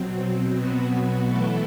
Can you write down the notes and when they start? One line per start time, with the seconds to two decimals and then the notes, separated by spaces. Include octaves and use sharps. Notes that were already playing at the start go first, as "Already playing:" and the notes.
Already playing: B2 F#3 C4
0.57 B2 F#3 B3 F#4
1.26 E3 A3 E4 A4